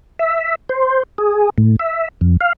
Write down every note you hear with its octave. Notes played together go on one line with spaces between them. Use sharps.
E5
C5
G#4
A2
E5
F2
F5